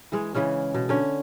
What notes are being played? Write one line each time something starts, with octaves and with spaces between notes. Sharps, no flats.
E3 G#3
C#3 E3 G#3 C#4
B2
D3 C#4